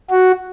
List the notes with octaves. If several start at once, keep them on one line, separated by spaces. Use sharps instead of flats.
F#4